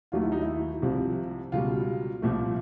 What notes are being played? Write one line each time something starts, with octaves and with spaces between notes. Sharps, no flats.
D#2 D#3 F#3 A3 F4
E4
D#4
E4
C2 C3 F3
C#2 B2 G3 F4
C2 A#2 F3 A3